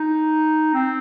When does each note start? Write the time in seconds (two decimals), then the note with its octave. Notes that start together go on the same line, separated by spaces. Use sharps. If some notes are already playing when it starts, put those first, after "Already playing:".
Already playing: D#4
0.74 C4